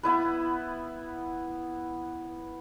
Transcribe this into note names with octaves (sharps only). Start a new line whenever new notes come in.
B3 E4 B4